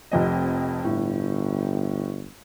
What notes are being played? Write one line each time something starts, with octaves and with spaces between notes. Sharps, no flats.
F1 F2 D#5
G1 A2